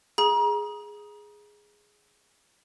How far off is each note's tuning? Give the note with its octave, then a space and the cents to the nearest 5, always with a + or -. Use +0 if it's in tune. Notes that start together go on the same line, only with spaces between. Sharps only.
G#4 +0 A#5 +35